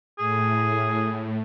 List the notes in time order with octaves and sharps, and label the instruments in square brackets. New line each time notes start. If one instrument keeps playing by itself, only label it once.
[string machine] A2 [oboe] G#4